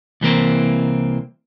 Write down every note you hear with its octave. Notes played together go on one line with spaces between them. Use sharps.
C2 E3 A#3 C4